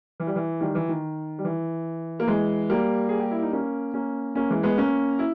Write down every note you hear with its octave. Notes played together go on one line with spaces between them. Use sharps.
E3
G3
E3
D#3 G3
E3
D#3
G3
E3
A#3
E3 G#3
G3 A#3
G#4
G4
E4
D#4
A#3 C#4
A#3 C#4
A#3 C#4
E3 G#3
G#3 B3
A#3 C#4
E4